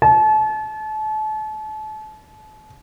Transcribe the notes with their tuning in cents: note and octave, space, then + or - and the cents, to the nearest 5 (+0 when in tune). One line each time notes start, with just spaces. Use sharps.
A5 -35